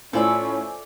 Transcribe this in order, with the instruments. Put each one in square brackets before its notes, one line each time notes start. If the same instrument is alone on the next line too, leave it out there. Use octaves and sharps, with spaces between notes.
[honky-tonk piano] A2 [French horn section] C#4 [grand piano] F4 C5 G#5 [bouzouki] A4 D5 E5